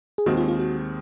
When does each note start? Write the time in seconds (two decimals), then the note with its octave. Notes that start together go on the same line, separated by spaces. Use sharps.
0.18 G#4
0.26 D#2 D#3 G#3 C4 F#4
0.37 F4
0.48 F4
0.59 F#4